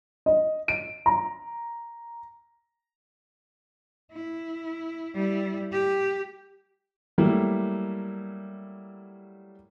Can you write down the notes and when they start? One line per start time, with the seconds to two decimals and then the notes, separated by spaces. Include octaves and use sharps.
0.26 D#5
0.68 D7
1.06 A#5
4.13 E4
5.15 G3 E4
5.72 G4
7.18 F#3 G3 A3 A#3 E4